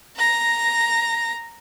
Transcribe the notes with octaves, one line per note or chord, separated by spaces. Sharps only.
A#5 A#6